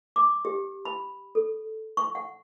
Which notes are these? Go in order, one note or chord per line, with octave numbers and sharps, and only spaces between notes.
D6
G4
B5
A4
C#6
F#5